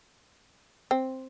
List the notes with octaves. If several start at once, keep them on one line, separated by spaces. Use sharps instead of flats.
C4